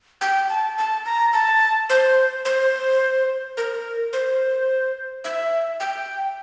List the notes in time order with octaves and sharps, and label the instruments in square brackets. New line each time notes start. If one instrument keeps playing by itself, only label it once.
[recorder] G5
A5
A5
A#5
A5
C5
C5
A#4
C5
E5
G5